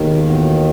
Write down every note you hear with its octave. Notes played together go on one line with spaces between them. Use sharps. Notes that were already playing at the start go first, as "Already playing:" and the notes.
Already playing: D#2 B2 D#3 G#3 D#4
A2 E3 B3 F#4